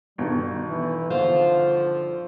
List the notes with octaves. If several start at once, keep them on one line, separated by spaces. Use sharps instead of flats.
G1 B2 D#3 G3
E3 E4
D3 F3 F4 C5 F5